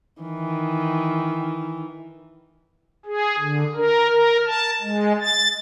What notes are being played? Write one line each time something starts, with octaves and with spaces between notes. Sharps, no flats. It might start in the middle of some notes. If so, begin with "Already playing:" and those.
D#3 E3
G#4
D3
A#4
A#4
A5
G#3
A6